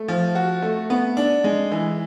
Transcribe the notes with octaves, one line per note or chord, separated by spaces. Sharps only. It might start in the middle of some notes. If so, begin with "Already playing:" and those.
Already playing: A3
F3
F#4
A3
B3
D4
G#3
E3